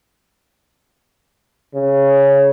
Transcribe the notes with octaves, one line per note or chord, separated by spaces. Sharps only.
C#3